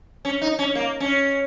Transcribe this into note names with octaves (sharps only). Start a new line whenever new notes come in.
C#4
D#4
C#4
A#3
C#4